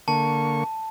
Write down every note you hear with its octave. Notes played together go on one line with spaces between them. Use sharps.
D3 A#3 A5 C#6